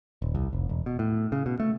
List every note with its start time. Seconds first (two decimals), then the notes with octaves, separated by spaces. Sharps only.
0.22 D#1
0.35 C2
0.53 F1
0.69 E1
0.86 B2
0.99 A2
1.32 C#3
1.46 B2
1.60 A3